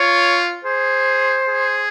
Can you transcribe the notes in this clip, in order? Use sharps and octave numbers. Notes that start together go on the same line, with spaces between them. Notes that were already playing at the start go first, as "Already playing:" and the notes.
Already playing: F4 C#5
G#4 C5
G#4